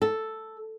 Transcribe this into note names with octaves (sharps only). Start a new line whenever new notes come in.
A4